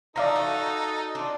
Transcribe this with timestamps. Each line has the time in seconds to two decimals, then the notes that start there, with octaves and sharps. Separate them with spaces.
0.16 F3 A3 D#4 A4 D5 F5 A#5
0.36 F#4
1.15 D4 F4